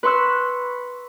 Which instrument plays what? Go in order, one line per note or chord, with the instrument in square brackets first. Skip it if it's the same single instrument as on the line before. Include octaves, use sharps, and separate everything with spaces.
[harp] B4 C6 C#6 E6 F#6